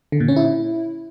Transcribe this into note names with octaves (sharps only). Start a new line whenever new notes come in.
D3
A#2
C#4
E4